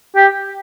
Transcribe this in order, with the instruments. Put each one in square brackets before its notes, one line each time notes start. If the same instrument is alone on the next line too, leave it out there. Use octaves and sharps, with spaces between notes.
[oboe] G4